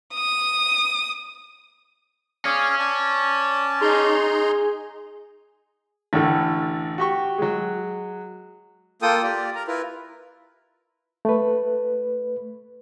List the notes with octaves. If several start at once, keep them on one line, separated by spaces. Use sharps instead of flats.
D#6
C#4 G#4 D5 F5
D5 A5
D#4 G#4 A#5 C6
A1 A2 D3 A4
F#4 G4 C#6
F#3 G#3
A#3 F4 A4 G5 D#6
F4 G4 D5
A#4 A#5
E4 F4 A#4 B4
A3 B4